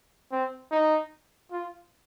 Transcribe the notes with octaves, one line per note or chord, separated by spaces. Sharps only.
C4
D#4
F4